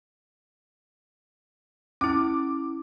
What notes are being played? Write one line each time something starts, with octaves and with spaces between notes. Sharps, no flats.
C#4 E4 D6